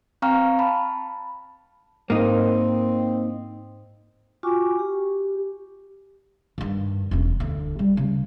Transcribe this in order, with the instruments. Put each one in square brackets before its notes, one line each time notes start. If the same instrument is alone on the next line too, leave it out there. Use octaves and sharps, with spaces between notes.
[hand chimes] C4 F5 G5 A#5 C#6 F6
A5 B5
[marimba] G#2 A#4 [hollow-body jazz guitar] A#3 D#4 [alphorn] C4
[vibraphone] F4 F#4 G5 G#5 C#6 D6
G4
[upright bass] G2 D#3
E1 C#4
D2
G3
C#3